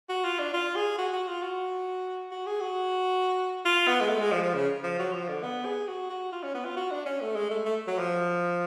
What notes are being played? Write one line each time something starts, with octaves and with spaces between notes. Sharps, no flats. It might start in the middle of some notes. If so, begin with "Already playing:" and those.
F#4
F4
D4
F4
G#4
F#4
F#4
F4
F#4
F#4
G#4
F#4
F4
B3
G#3
A3
G#3
F3
F3
C#3
F3
F#3
F3
D3
B3
G#4
F#4
F#4
F4
C#4
B3
F4
F#4
D4
C#4
A3
G#3
A3
A3
F#3
F3